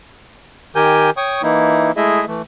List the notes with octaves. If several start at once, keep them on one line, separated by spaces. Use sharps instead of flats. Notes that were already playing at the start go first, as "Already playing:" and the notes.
D#3 G4 A#4 G#5 G6
C#5 G5 C#6 D#6
E3 A#3 D#4 E4
G#3 A3 E4 G#4 D#5 E5
E3 A3